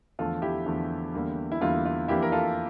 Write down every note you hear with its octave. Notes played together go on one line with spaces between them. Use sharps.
E2 D3 F3 A3 F4 A4
E4 G4
E2 D3 F3 A3
E2 D3 G3 A#3
E4
E2 D3 G3 A#3 F4
F4
F2 E3 A#3 D4 E4 G4
A#4
F4 A4